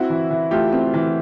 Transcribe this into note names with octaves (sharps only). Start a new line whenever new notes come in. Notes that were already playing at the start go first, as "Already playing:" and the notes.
Already playing: C4 E4 F#4
E3
E3
A3 F4 G4
C4
E3